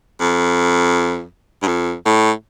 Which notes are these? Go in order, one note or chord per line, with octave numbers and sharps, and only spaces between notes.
F2
G2
F2
A2